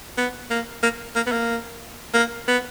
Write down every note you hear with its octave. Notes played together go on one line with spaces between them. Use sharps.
B3
A#3
A#3
A#3
B3
A#3
A#3
B3